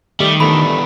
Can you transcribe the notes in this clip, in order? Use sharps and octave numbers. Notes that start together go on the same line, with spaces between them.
D#3 G3 A3
E3 F3 G3 A3 B3 D4 B5